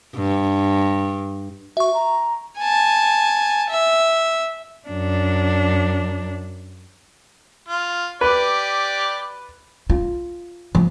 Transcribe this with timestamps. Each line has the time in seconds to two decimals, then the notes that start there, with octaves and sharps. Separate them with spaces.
0.15 G2
1.77 F#4 E5 C#6
1.94 A#5
2.58 G#5 A5
3.70 E5
4.88 F#2 D4
7.68 F4
8.21 G4 B4 D5
9.90 F4
10.75 F3